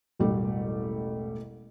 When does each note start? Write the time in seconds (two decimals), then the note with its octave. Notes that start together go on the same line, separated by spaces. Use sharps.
0.19 E1 A1 G3 A3